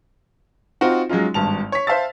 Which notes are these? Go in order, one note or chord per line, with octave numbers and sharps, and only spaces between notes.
C4 D#4 F4 F#4
F#3 G#3 C#4 D#4 F4
G#1 G2 A5 F7
C#5 B6
C5 E5 F5 A5 E6 A6